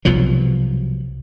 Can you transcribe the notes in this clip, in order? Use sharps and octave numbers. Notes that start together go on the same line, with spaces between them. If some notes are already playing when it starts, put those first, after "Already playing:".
C2 B2 F3 F#3